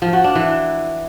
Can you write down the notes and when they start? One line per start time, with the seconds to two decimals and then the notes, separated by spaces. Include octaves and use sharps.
0.02 F3
0.13 F#4
0.24 D4
0.35 E3